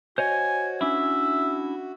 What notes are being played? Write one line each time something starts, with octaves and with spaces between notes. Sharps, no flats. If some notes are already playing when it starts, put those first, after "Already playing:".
F#4 C5 C#5 D#5 G#5
C#4 D4 E4 E5